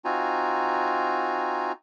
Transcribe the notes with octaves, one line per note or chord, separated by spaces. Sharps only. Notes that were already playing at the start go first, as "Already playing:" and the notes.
C4 D#4 F4 F#4 G#5 A#5